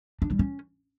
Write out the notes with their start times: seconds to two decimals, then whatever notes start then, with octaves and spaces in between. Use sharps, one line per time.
0.22 D4
0.30 G3
0.39 C#4